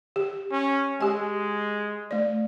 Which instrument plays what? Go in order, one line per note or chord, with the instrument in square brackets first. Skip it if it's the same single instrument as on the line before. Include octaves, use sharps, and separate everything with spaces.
[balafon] G4
[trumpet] C#4
[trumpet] G#3 [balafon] G4 G#5
[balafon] A3 D5